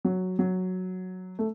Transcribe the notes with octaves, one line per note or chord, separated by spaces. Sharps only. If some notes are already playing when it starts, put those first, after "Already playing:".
F#3
F#3
A3